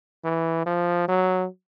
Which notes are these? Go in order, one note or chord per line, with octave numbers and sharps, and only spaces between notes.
E3
F3
F#3